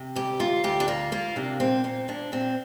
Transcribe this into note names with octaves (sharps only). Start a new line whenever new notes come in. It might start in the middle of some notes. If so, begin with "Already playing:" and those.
Already playing: C3
D2 G4
D2 F4
D2 G4
D4
A#3 F4
A#3 F4
C3 D4
A#2 C4
A#2 C4
A#2 D4
A#2 C4